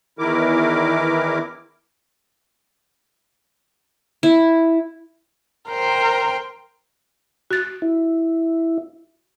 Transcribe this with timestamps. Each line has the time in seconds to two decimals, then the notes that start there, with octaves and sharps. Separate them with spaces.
0.19 E2 D#3 E3 E4 A#4 D6
4.23 E4
5.69 A#4 C5 G5
7.51 F#4 A6
7.82 E4